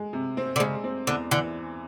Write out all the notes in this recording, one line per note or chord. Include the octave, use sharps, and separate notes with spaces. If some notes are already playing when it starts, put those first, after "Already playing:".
Already playing: G#3
C3
C4
D3
C#3 G#3
C4
E2 D3
D3 E3